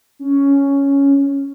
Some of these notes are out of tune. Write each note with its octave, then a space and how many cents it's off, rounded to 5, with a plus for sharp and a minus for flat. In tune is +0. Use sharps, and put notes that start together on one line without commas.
C#4 +5